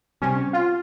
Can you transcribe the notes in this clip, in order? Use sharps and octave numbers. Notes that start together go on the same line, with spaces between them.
C3 G3 C4 C#4
F4